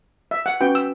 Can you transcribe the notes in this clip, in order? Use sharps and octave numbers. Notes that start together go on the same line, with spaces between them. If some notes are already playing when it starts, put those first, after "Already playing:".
E5
F#5
C#4 F#4 B4 G5
E6